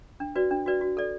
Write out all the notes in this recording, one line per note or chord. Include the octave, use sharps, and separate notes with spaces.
D4
F#4 B4 D5
D4
F#4 B4 D5
F#4
A4 D5